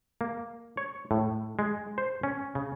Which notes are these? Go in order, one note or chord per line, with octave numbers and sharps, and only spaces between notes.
A#3
C#5
A2
G#3
C5
C#4
C#3